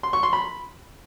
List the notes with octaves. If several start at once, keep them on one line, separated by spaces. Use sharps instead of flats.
C6
C#6
C6
B5